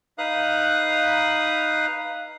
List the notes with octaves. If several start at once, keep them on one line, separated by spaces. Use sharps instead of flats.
D#4 B4 F5 D#6 F#6